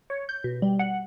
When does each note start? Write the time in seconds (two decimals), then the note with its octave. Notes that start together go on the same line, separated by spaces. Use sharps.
0.10 C#5
0.29 G6
0.44 B2
0.62 G3
0.79 F#5